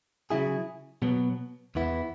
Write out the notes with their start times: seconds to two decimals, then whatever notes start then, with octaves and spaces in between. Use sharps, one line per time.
0.30 C#3 F#3 E4 G#4
1.02 B2 F#3 B3
1.75 E2 E3 B3 E4